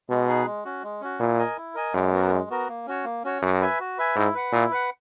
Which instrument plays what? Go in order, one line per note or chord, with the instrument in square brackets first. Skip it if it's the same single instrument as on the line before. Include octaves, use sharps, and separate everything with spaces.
[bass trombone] B2 [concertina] G#3
[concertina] D#4 G#4 B4
G#3
C#4 F#4
G#3
C#4 F#4
[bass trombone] A#2 [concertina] E4
[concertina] A#4 D#5 G#5
E4
A#4 D#5 G#5
[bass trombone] F#2 [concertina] G#3
[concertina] B3 F#4 A#4
G#3
B3 F#4 A#4
A#3
C#4 F#4 C#5
A#3
C#4 F#4 C#5
[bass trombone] F#2 [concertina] F#4
[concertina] B4 E5 G#5
F#4
B4 E5 G#5
[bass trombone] G#2 [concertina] E4
[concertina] B4 F#5
[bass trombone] A#2 [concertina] E4
[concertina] B4 F#5